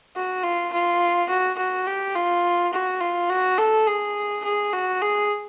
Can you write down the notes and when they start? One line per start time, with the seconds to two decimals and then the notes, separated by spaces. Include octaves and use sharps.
0.16 F#4
0.44 F4
0.72 F4
1.29 F#4
1.58 F#4
1.87 G4
2.16 F4
2.73 F#4
3.01 F4
3.30 F#4
3.58 A4
3.87 G#4
4.44 G#4
4.73 F#4
5.02 G#4